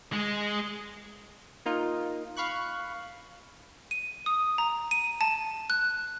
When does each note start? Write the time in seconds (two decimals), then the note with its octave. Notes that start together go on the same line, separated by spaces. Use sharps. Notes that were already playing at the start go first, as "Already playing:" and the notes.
0.13 G#3
1.66 A#3 D#4 F4
2.37 F5 B5 C#6 F#6
3.91 D#7
4.26 D#6
4.58 A#5
4.91 D#7
5.21 A5
5.70 F#6